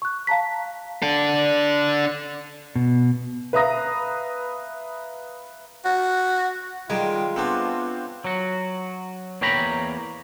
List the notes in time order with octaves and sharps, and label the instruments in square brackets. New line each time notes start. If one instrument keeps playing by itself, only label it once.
[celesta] C#6 F#6
F5 A5 A#5 B6
[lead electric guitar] D4 A4
[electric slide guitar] B2
[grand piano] B4 E5 F5 A#5 D#6 A#6
[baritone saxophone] F#4
[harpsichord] D#3 G3 [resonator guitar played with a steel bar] G#3 [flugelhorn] F4
[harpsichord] A3 B3 [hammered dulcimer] C4 D4 C#5
[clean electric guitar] F#3 F#4
E2 A#3 C#5 G5 A#5 B5